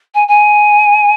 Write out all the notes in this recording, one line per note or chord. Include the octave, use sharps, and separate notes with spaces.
G#5
G#5